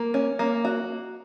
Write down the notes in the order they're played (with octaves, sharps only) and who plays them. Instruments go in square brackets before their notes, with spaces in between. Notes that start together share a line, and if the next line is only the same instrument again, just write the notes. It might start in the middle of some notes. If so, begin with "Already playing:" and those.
Already playing: [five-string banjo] A#3
C#4
A#3
F#4